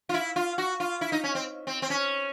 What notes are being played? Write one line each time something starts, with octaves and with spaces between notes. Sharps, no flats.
F4
E4
F4
F#4
F4
E4
D#4
C#4
C4
C4
C4
C#4